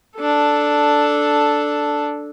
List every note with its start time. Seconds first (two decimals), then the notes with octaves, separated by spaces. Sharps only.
0.16 D4 A4